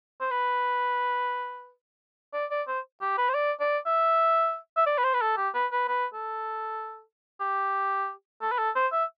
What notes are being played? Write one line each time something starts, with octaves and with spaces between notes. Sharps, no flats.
C5
B4
D5
D5
C5
G4
B4
C5
D5
D5
E5
E5
D5
B4
C5
B4
A4
G4
B4
B4
B4
A4
G4
A4
B4
A4
C5
E5